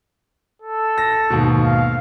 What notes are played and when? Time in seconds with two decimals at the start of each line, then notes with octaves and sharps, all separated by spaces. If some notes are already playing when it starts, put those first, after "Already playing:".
0.62 A4
0.98 A#6
1.30 D#2 G#2 B2
1.62 F5